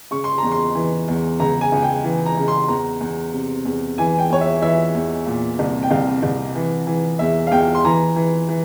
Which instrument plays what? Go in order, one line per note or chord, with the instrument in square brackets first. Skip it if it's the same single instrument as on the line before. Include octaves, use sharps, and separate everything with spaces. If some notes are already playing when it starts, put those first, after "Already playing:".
[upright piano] C#3 C#6
C6
E2 A#5
C6
E3
E2
C#2 A#5
G#5
C#2
G5
E3
A#5
C#3
C6
E2 A#5
E2
C3
E2
E3 G#5
G5
E2 C#5
E5
E3 E5
E2
A#2
C2
G5
C2 F5
C2
E3
E3
E2 E5
F5
E2 G5
C6
E3 A#5
E3
E3